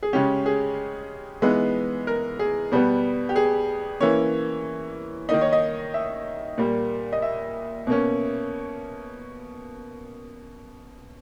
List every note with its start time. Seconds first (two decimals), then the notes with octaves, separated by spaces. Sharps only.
0.03 G#4
0.13 C#3 G#3 C#4 G4
0.46 G#4
1.42 E3 G#3 B3 D#4
2.07 A#4
2.39 G#4
2.72 B2 G3 B3
3.29 G4
3.36 G#4
4.00 E3 A#3 C#4 C#5
5.29 D#3 A#3 D#4 D#5
5.41 C#5
5.53 D#5
5.94 E5
6.58 A#2 G3 A#3
7.13 D#5
7.22 E5
7.87 B2 A#3 C#4